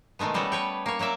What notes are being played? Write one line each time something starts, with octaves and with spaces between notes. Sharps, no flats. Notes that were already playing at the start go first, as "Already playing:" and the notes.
B2 D#3 G#3 A3 B3
G3 B3 C#4 F#4 A4
B4 C#5 G5
A#3 C#5
F#3 A#3 D5 E5